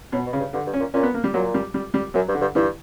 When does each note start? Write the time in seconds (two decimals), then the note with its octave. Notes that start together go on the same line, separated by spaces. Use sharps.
0.12 B2 F#3
0.26 B2
0.33 C#3
0.40 G2
0.53 G2 D3
0.67 G2
0.73 C#4
0.80 A#2
0.94 A#2 C#4
1.03 B3
1.14 A#3
1.24 G3
1.34 A#2 F#3
1.54 G3
1.74 G3
1.94 G3
2.14 F#2 F#3
2.28 G2
2.34 D3
2.41 G2
2.55 G2 E3